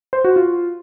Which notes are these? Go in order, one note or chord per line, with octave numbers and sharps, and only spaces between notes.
C5
F#4
F4